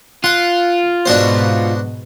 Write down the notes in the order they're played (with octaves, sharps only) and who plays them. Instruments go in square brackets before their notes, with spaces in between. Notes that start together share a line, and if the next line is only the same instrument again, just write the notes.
[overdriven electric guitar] F4 [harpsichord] F#5
[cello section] G#2 B2 [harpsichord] D4 F#4 C5